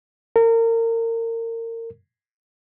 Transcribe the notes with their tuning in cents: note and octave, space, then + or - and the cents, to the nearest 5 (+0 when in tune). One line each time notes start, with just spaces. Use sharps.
A#4 -30